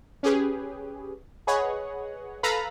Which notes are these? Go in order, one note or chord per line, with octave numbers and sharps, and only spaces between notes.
C#4 G4 G#4 B4
G#4 B4 C#5 D#5 F#5
A4 B4 F5 A#5 B5